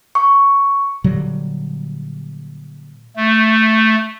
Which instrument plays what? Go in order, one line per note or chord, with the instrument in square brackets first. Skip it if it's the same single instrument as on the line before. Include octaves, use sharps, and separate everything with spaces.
[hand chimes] C#6
[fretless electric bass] A#2 D3 F#3 G3
[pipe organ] A3